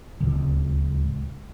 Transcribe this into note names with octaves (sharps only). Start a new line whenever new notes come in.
D1 C#2